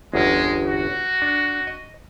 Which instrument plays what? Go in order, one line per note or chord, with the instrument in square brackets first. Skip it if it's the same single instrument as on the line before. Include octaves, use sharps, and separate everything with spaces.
[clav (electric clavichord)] G1 E2 C#4 [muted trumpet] G#3
[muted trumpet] F#4
[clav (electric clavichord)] D4
D#5